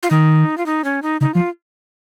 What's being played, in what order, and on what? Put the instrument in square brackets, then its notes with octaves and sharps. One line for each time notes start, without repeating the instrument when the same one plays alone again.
[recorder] F4
[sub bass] D#3 [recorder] D#4
[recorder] F4
D#4
C#4
D#4
[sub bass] C#3 [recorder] D#4
[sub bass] F3 [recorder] F4